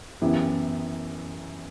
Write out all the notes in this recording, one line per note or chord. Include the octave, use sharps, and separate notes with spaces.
F#2 E3 B3 E4 G4